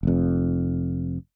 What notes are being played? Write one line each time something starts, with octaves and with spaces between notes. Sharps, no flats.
F1 F2